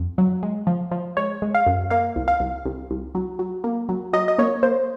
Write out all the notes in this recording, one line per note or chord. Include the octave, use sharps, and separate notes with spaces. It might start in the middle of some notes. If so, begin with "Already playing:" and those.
Already playing: F2
F#3
G#3
F3
F3
G#3 C#5
G#3
F5
F#2
A#3 F5
C2
F5
C2
C2
C2
F#3
F#3
A#3
F#3
F#3 D#5
D#5
A#3 C#5
A#3 C5